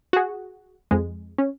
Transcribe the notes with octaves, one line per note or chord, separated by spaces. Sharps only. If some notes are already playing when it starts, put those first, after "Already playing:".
F#4 G#4
F2 G#3
C#4